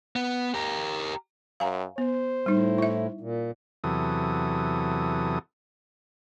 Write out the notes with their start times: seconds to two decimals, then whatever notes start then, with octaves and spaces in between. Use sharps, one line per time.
0.16 B3
0.54 G4 A#4
1.60 F#2 F5 G#5 A#5
1.98 B3 C5
2.46 A2 G3 D#4
2.78 E4 E5
3.21 A#2
3.84 E2 C3 E3 F#3 A4 D#6